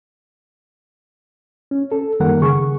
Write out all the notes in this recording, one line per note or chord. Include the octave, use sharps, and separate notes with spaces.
C#4
A4
F#2 D#3 G3 A#3 A#4 F#5
C#3 G#4 C#6